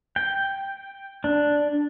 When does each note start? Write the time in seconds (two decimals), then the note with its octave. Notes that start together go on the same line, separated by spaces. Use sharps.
0.16 G5
1.24 D4